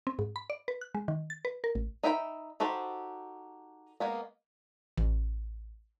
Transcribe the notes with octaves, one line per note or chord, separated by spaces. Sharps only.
C4
G#2
B5
D5
B4
F#6
G#3
D#3
A6
B4
A#4
A1
D#4 E5 G5 A5 B5
D#4 F#4 G4 A4 C5
G#3 A#3 B3
A1